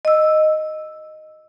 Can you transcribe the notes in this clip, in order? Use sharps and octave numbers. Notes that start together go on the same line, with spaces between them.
D#5 E6